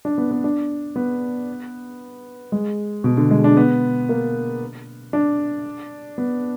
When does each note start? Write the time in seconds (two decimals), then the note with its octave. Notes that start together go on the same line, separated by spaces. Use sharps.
0.05 D4
0.18 B3
0.31 B3
0.44 D4
0.96 B3
2.52 G#3
3.04 B2
3.17 D3
3.31 G#3
3.44 D4
3.57 B3
4.09 A#3
5.13 D4
6.18 B3